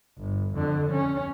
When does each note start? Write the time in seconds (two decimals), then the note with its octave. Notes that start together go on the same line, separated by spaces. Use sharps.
0.19 G1
0.55 F2 D3
0.91 C#4